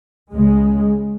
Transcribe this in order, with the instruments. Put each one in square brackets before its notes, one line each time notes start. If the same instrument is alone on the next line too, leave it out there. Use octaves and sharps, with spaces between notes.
[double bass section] C#2 C#3 G#3